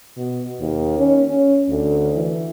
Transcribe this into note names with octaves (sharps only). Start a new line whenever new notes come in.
B2
D#2
C#4
C#4
D2
E3